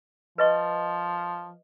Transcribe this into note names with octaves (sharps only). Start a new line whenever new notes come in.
F3 B4 D#5 C#6